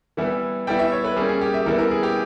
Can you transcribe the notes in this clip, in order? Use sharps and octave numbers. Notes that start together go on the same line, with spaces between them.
E3 G3 B3 E4
G3 B3 E4 G5
E5
C#5
B4
G3 A#3 C#4 G#4
G#4
G4
E5
E3 G3 B3 E4 A#4
A#4
G#4
G4